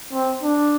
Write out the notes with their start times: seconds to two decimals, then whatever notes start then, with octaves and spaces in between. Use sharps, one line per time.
0.13 C4
0.43 D4